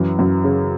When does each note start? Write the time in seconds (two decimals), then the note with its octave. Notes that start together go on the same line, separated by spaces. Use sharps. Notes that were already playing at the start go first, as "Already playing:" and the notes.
Already playing: F#2 E3
0.19 F#2
0.44 C#3